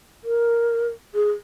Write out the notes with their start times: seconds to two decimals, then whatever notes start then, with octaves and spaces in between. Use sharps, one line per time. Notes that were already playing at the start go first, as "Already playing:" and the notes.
0.24 A#4
1.14 G#4